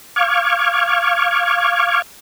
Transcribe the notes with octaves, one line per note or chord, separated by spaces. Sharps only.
F5 C#6 D6 F6 G#6